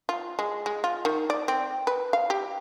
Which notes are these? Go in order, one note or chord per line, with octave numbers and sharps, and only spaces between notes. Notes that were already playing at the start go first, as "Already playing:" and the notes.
F4
G#3
G#3
F4
D#3
D5
C4
B4
F5
G4